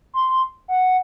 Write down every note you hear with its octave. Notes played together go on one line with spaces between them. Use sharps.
C6
F#5